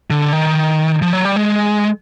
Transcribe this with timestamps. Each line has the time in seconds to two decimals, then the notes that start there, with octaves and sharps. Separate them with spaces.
0.10 D3
0.33 D#3
1.02 F3
1.13 F#3
1.25 G3
1.36 G#3